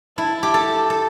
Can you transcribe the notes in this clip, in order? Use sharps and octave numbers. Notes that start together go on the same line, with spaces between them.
E4 A5
G4
A4 A5
A4